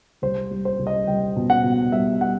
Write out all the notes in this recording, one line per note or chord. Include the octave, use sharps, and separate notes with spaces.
C2 C5
G3
C5
C2
D#5
C2 G5
B2
F#5
B2
G3 E5
G3 F#5